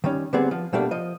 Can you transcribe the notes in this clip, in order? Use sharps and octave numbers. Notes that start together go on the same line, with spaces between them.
D#3 G3 C#4
D3 G3 B3 C4 G#4 D5
F3
B2 G3 A3 A#3 D4
F3 D#5